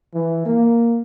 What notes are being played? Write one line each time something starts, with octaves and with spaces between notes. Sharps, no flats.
E3
A#3